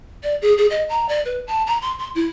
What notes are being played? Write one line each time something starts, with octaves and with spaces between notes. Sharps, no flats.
D5
G#4
G#4
D#5
A#5
D5
B4
A5
A#5
C6
C6
E4